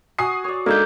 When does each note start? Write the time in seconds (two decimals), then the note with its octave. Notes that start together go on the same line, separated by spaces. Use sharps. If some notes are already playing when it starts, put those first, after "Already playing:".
0.19 F#4 G#5 D#6 C7
0.44 C#5 D5
0.66 G#3 A#3 D4 D#4 A4 E5 F5 G6